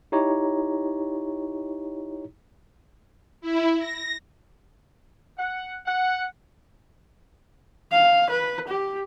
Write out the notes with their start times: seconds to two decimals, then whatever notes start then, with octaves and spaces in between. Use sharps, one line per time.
0.12 D#4 E4 G4 C#5 A#5
3.41 E4
3.79 A#6
5.38 F#5
5.86 F#5
7.92 F5
8.30 B4
8.68 G4